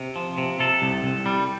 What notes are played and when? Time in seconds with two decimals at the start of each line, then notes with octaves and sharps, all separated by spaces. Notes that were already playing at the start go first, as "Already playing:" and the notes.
Already playing: C3
0.16 F3
0.38 C3
0.60 C3 A4
0.82 C2
1.04 C2
1.26 G3